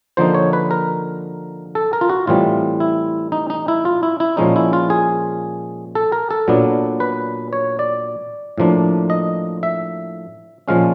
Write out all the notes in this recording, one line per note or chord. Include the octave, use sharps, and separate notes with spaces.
D3 F3 A#3 D#4 C5
C#5
B4
A#4
A4
A#4
F4
F#4
A2 E3 G3 C4 F4
E4
D#4
D#4
E4
F4
E4
E4
A#2 F3 G#3 C#4 D#4
E4
F4
G#4
A4
A#4
A4
A#2 F#3 B3 D4
B4
C#5
D5
A2 F3 A#3 D4
D#5
E5
A#2 F3 G#3 C#4 F5